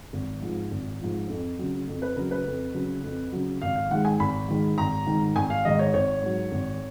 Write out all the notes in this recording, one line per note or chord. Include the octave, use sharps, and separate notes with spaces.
G#1
G#2 F3
G#1
G#2 F3
F2
C#3 F#3
F2
B4
C#3 F#3 A#4
B4
F2
C#3 F#3
F2
C#3 F#3
G#1 F5
F5
G#2 D#3 G#3 F#5
G#5
G#1 B5
G#2 D#3 G#3
G#1 A#5
G#2 D#3 G#3
G#1 G#5
F5
G#2 D#3 G#3 D#5
C#5
G#1 C#5
G#2 F#3
G#1